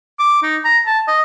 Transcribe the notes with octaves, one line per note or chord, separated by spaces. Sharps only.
D6
D#4
A#5
A5
D#5